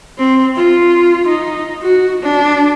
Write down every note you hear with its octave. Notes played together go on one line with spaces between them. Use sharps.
C4
F4
D#4
F#4
D4